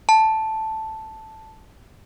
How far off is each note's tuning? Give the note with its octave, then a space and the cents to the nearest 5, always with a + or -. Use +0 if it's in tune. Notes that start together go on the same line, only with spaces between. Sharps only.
A5 +0